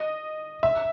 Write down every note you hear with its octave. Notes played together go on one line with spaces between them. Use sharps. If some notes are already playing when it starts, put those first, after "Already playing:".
Already playing: D#5
E5